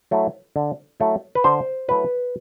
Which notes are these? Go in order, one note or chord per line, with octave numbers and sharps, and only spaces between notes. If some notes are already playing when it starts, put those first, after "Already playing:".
F#3 A3 E4
D3
F#3 A3 E4
B4
D3 C5
F#3 A3 E4 B4